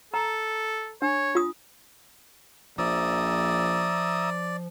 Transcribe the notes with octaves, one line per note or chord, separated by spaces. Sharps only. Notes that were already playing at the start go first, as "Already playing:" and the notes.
A4 A#5
D4 C#5
F4 D#6
A#1 F3 D5 E5 A#5 D#6